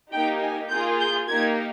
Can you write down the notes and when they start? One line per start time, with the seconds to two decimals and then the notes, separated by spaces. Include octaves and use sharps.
0.13 A#3 D#4 G4 G5
0.41 G#5
0.71 A#3 F4 G#4 G6
1.00 G6
1.29 A#3 D#4 G4 G#6